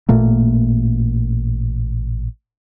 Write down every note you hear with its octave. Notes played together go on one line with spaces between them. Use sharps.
A1 A#2 A3 A#3